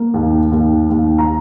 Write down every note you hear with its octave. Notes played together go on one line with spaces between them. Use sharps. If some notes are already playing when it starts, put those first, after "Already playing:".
Already playing: A#3
D#2
D#2
D#2
A#5